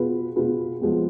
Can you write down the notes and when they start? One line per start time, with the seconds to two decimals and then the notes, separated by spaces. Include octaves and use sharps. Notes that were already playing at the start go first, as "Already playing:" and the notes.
Already playing: B2 B3 F4 G#4 B4
0.36 B2 B3 F4 G#4 B4
0.81 F3 G#3 B3